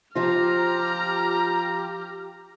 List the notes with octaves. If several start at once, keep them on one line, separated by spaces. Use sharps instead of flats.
F3 F4 G4 A#5 F6 A#6